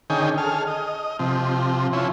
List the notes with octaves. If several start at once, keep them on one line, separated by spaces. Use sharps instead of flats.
D3 D#3 C#4 G#4 D#5 G5
G#4 A4 F6
D#5
C3 F3
F3 C#4 E4